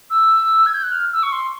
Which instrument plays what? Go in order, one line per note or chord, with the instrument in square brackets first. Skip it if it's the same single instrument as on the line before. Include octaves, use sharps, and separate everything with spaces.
[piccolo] E6
G#6
G6
F#6
F6
E6
C#6
C6